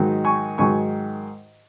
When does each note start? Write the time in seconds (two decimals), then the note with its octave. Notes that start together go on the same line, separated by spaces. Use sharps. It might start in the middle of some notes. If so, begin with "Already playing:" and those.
Already playing: G#2 D#3 F#3
0.25 G#5 C#6
0.58 G#2 D#3 F#3 G#5 C#6